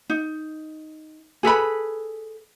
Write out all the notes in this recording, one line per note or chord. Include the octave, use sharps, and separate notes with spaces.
D#4
G#4 A4 B4 B5